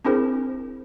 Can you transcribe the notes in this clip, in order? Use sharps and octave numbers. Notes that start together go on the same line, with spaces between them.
C4 D4 E4 G#4 A#4 C5